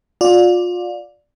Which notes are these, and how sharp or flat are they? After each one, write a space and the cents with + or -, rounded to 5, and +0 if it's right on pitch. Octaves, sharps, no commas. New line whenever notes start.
F4 +30 D5 +0